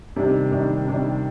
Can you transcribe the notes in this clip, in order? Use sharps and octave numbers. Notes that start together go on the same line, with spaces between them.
C3 D#3 G3 D4
C3 D#3 G3 D4
C3 D#3 G3 D4